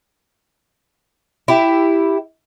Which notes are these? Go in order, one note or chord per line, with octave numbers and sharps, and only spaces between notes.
E4 G4